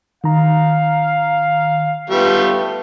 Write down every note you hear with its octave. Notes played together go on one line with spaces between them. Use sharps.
D#3 F5 A#5
G3 A3 B3 F4